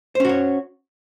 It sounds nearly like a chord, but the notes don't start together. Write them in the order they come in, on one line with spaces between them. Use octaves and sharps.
C5 C#4 F#4 C#5